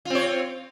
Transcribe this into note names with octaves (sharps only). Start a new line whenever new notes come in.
C4 F4 C#5